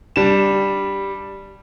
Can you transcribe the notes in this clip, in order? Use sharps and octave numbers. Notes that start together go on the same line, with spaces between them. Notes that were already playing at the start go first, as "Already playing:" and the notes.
G3 D4 E7